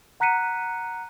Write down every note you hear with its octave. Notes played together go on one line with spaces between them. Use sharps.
F#5 A#5 F#6 B6 C#7 D#7